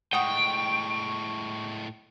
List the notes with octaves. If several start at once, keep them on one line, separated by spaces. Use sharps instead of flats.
A2 G#3 F#5 G5 C#6 D#6 D7